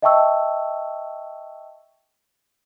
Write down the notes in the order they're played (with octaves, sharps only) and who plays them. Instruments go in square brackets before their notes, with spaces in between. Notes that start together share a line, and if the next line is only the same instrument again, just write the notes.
[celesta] D#5 E5 G5 A5 C#6 E6